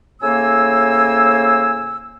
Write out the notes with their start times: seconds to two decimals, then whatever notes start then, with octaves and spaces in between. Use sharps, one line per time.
0.21 A2 C#3 A#3 C5 G#5 E6